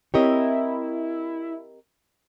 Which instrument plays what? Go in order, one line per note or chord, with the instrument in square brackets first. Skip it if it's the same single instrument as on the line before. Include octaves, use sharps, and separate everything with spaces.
[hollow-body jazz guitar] C4 C#5 [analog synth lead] E4 [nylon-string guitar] G4 A#4 D#5